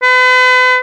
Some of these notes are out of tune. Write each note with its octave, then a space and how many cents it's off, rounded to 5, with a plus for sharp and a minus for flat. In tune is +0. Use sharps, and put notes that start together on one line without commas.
B4 +40